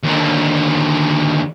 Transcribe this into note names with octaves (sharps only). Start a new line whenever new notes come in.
D#2 D3